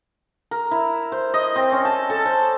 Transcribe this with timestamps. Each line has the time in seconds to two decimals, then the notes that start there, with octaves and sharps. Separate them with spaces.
0.51 A#4
0.71 E4
1.12 C5
1.34 D#5
1.56 C4
1.72 C#4
1.85 A5
2.10 A4
2.26 C5